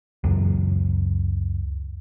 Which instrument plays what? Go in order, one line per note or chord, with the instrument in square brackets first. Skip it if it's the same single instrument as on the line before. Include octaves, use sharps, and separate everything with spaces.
[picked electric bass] C#2 F#2